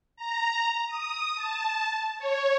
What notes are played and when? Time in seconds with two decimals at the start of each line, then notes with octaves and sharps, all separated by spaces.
0.16 A#5
0.87 D#6
1.36 A5
2.18 C#5